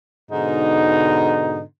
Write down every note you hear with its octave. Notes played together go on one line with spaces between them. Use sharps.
G#2 B2 D3 D#4